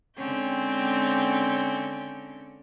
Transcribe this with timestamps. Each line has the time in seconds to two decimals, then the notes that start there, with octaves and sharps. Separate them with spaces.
0.16 D3 G#3 C4 C#4 G5